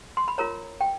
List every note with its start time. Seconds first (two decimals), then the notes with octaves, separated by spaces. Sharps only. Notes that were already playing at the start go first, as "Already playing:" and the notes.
0.17 C6
0.28 B5
0.38 F4 A#4 C#5 A#5
0.81 G5